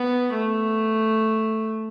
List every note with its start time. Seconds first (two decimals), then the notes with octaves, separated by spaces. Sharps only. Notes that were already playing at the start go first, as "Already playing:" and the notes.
Already playing: B3
0.33 A3